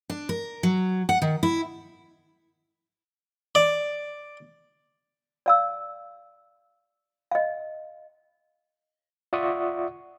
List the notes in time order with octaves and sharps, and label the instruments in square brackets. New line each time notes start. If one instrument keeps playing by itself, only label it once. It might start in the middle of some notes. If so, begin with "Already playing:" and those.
[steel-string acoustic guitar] D4
A#4
F#3
F#5
D#3
E4
[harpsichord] D5
[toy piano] D5 F5 E6
D#5 F5
[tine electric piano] F4 D5 E5 F#5 C#6 D#6